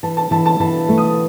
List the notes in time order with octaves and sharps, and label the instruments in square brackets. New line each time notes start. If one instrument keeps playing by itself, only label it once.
[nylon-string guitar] E3 [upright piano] A5
[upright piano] A5
[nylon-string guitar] E3 [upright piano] A5
[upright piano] A5
[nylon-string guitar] E3 [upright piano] A5
[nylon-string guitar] A3
[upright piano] D#6